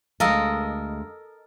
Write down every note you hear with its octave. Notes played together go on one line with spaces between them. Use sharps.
D2 G#3 A4 A#4 D#5 F5